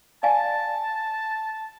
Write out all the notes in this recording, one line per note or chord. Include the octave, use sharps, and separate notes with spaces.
D5 F5 G#5 A5